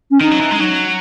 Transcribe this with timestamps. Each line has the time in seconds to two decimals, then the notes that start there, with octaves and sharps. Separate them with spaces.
0.11 C#4
0.21 D#3 D#4
0.31 F#3
0.41 E3
0.51 G#3
0.60 F#3